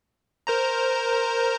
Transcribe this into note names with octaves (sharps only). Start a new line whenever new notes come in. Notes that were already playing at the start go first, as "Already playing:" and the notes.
A#4 C5 A#5